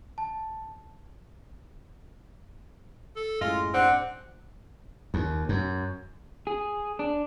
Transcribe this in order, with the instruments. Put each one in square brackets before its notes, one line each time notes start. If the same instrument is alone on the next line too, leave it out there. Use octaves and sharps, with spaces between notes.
[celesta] A5
[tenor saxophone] A4
[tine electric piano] F#2 A2 A#6 [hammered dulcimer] G#3 [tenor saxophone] F4
[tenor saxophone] C4 [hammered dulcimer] D4 [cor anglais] F#5
[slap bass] D#2
F#2
[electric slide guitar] G#4
D4